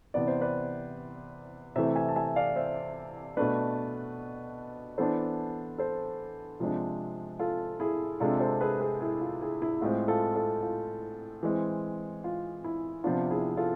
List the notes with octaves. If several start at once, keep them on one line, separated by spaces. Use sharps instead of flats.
C3 E3 B3 D5
C5
B4 D5
C3 E3 A3 C5 E5
E5 G#5
A5
E5 G#5
D5 F5
C5 E5
B2 A3 D4 B4 D5
E3 B3 D4 A4 C5
A4 C5
C3 F3 G#3 D4
F4 A4
E4 G#4
C3 G#3 D4 F4 A4
A4 C5
G#4 B4
G#4 B4
E4 G#4
F4
E4 G#4
E4
A2 G#3 C4 F4
F4 A4
F4 A4
F4
E3 G#3 C4
F4
E4
C3 F3 B3 D4 F4
E4 G#4
F4 A4